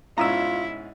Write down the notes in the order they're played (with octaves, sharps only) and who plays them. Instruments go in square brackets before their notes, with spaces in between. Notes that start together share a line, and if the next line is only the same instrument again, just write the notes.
[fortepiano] G#2 B2 C#4 [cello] E4 [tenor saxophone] F4 [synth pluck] A#5 D#6 E6